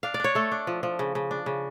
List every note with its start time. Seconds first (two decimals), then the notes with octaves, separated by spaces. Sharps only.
0.03 D4 F5
0.14 D5
0.20 D4 C#5
0.35 A3 A4
0.52 D4
0.67 F3
0.83 F3
0.99 C#3
1.15 C#3
1.31 D4
1.46 C#3